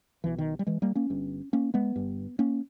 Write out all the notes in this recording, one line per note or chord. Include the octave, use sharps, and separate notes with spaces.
B1 B2 E3
D#3
G3
E3 G#3
G3 A#3
A#3 C#4
G1 G2
A#3 C#4
G#3 B3
G1 G2
A#3 C#4